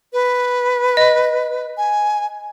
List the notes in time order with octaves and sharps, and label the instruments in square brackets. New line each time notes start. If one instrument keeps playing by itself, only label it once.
[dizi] B4
[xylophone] D#5
[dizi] G#5